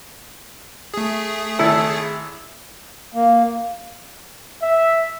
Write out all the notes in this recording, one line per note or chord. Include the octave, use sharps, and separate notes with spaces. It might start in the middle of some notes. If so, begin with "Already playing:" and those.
A3 G#4
G#1 E4 A4
A#3
E5